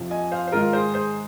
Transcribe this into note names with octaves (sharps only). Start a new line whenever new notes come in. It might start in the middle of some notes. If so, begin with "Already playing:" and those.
Already playing: F2 C3 F3
D#5 G#5
C5 F5
C5
G#2 D#3 G#3 F4 A#4
G#4 C5
G#4 C5